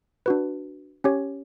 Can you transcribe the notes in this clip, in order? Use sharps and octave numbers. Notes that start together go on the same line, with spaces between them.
D4 F#4 B4
C#4 G4 C#5